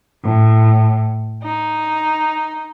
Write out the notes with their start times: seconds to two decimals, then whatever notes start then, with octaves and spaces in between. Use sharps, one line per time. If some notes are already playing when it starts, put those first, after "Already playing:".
0.23 A2
1.42 D#4